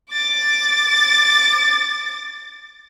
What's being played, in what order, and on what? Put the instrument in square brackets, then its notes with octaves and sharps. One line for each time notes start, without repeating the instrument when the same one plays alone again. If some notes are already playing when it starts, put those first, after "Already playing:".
[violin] D6 A6